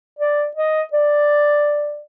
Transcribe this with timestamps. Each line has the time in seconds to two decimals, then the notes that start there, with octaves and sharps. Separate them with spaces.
0.19 D5
0.56 D#5
0.93 D5